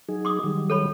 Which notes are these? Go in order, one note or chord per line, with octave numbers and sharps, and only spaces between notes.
F#3 D#4 G#4
C6 D6 D#6
D#3 F#3 G3
A4 C#5 B5